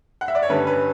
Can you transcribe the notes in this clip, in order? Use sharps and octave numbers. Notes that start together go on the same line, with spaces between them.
F#5
E5
D5
C#5
G2 D3 G3 C#4 B4
B4